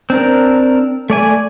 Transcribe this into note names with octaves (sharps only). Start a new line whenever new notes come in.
C4 D4 A#4
A3 D5 G#5